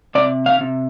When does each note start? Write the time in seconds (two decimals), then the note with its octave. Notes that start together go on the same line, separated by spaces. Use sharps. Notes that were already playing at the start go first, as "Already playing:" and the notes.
0.15 C3 D5
0.46 F5
0.61 C3